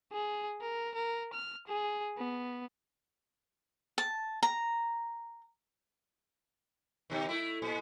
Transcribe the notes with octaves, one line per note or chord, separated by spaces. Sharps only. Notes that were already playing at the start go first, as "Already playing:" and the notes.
G#4
A#4
A#4
F6
G#4
B3
A5
A#5
B2 D#3
A3 E4
A#2